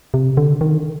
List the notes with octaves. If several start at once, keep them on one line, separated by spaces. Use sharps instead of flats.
C3
D3
D#3